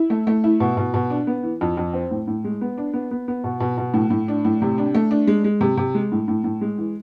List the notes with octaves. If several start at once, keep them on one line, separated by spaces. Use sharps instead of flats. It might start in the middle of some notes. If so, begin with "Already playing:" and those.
Already playing: E4
A3
A3
E4
B2
B2
B2
D4
B3
E3
F2
F2
C4
A2
A2
G#3
B3
D4
B3
B3
B3
B2
B2
B2
A2
A2
D4
A2
C3
D4
A3
D4
G#3
G#3
C3
C3
G#3
A2
A2
A2
G#3
E3